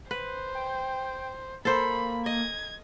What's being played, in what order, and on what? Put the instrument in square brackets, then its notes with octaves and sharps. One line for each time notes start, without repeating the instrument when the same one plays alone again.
[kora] B4 [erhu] C5
[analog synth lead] G5
[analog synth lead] A#3 [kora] A4 C5 [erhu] B5
[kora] D#5 [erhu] G#6